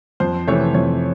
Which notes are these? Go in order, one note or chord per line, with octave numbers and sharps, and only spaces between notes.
F2 C5
C3 E3 A3 C#5
F2 C#5